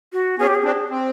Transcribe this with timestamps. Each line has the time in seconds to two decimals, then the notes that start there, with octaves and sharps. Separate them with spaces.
0.13 F#4
0.39 B3 C#4 G#4
0.47 G4
0.55 G#4
0.64 C4 D4
0.90 C4